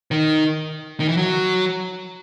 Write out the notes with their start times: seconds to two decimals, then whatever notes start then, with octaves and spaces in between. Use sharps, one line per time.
0.11 D#3
1.00 D#3
1.08 E3
1.17 F#3